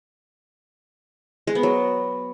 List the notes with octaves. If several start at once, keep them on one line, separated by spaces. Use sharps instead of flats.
G#3
B3
F#3